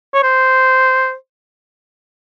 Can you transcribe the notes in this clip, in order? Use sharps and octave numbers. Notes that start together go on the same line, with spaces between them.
C#5
C5